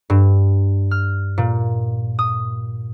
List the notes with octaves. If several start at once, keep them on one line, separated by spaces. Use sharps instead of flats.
G2
F6
A#2
D#6